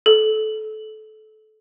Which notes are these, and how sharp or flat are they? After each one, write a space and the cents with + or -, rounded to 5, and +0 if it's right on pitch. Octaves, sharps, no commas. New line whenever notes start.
A4 -25